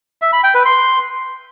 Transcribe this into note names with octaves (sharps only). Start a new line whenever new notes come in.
E5
B5
G5
B4
C6